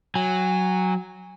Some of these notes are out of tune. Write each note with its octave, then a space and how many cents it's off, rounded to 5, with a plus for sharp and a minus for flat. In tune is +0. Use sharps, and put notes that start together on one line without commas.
F#3 +0 G#5 -25